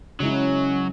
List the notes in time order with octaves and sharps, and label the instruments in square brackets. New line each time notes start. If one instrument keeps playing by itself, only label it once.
[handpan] C#3 G#3 E4 [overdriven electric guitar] F#3 [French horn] C#4